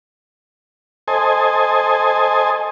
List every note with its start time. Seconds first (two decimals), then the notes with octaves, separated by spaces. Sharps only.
1.08 A4 C5 D#5 G#5